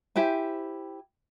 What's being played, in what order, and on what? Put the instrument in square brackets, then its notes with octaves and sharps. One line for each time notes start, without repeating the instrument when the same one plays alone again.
[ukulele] E4 G4 C5 G#5